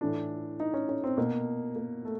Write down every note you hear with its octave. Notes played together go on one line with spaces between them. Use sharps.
A2 E3 D4
D#4
C#4
C#4
C4
B2 A#3
A#3
A3